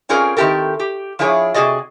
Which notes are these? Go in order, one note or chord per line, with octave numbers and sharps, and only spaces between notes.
C4 C#4 F4 G#4 A#4 D5
D#3 C4 E4 G4 A4 A#4
G4
F3 D4 E4 G#4 A#4 C#5
C3 F#4 G#4 D5 D#5